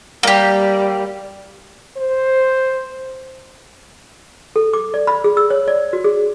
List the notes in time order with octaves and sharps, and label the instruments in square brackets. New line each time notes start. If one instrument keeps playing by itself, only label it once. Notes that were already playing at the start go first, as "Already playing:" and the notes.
[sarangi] G3 [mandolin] A#3 G4
[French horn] C5
[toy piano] A4
D6
D5
B5
G#4
E6
C#5
D5
F#4
G#4